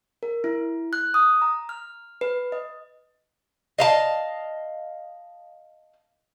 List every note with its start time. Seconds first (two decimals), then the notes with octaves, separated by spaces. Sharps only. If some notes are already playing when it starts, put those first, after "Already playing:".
0.23 A#4
0.44 E4
0.93 F#6
1.14 D#6
1.42 A#5
1.69 F6
2.21 B4
2.52 D#5
3.78 D#5 F5 A5